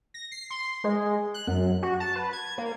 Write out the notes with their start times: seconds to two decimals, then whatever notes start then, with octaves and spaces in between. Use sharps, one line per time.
0.14 A#6
0.32 C7
0.50 C6
0.84 G#3
1.34 F#6
1.47 F#2
1.83 F#4
2.00 A5
2.16 B4
2.33 G#6
2.58 A#3